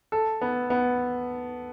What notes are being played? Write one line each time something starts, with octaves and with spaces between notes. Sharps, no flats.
A4
B3
B3